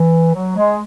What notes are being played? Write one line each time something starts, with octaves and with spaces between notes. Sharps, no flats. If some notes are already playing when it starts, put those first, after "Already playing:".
Already playing: E3
F#3
G#3